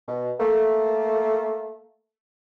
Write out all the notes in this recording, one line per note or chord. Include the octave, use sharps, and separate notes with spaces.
B2
A3 A#3